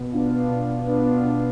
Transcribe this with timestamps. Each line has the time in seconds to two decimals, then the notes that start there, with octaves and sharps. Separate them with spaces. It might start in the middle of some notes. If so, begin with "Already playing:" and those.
Already playing: B2
0.12 B3 D4 F4
0.50 B2
0.87 B3 D4 F4
1.25 B2